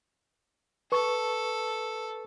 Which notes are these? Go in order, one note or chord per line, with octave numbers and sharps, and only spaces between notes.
A4 B4 C#6